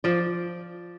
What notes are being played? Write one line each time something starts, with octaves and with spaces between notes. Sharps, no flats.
F3 D5